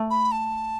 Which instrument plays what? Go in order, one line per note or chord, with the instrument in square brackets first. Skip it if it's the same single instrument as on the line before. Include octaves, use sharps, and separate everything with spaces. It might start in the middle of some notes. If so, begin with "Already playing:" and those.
Already playing: [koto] A3
[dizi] B5
A5